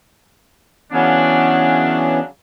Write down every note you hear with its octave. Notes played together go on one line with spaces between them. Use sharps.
C#3 E3 F#3 B3 C#4 D4